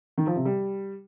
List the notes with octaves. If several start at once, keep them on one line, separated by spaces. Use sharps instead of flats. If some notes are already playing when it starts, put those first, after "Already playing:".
D#3
F3
C3
G3